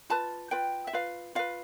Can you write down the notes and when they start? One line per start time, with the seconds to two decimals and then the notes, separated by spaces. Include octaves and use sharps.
0.10 F4 B4 A5
0.51 F4 B4 G5
0.87 E5
0.93 F4 B4 F5
1.35 F4 B4 F5